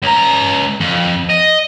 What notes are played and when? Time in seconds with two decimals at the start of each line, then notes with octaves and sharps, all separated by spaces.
0.02 C#2 A#5
0.80 F2
1.30 D#5